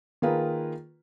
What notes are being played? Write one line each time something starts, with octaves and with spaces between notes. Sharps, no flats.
D#3 A#3 F4 G#4 B4